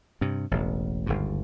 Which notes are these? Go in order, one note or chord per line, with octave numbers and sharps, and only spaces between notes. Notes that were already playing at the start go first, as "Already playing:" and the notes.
G2 C3
E1 A1
G1 D#2 G#2